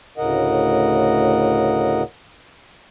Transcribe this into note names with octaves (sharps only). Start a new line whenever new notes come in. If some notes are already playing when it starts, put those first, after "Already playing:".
D2 A2 C#3 A#4 D#5 F#5